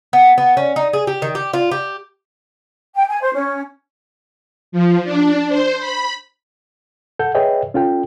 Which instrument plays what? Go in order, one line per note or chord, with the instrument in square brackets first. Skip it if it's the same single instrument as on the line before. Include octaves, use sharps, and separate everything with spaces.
[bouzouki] B3
B3
C#4
D#4
G#4
G4
D#3
G4
F4
G4
[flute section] G5
G#5
C5
C#4
[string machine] F3
D4
C5
B5
[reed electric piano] A4 F#5 G6
G#4 B4 C#5 D#5 E5 G5
C#4 F4 A4 G5